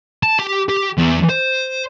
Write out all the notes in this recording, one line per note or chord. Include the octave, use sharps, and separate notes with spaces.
A5
G4
G4
E2
C5